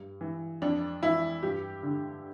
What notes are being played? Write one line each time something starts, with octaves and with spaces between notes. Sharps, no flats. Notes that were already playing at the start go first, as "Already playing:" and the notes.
Already playing: G2
E3
F2 D4
E3 E4
G2 G4
D3